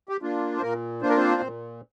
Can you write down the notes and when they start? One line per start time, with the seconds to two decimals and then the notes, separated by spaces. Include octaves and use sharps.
0.09 G4
0.22 A#3 D4 F4
0.57 C5
0.61 A#2 A#3 A#4
1.02 A#3 D4 F4 C5
1.09 A#4
1.17 C4 C5
1.41 A#2